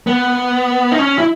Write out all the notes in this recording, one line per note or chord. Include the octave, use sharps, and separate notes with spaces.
B3
D#4
C#4
E4